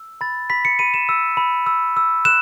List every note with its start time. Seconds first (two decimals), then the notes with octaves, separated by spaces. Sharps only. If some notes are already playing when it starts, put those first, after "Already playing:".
Already playing: E6
0.21 B5 A6
0.50 B5 B6
0.65 C#7
0.79 B5 D#7
0.94 E7
1.09 E6
1.37 B5
1.66 E6
1.97 E6
2.25 F#6 E7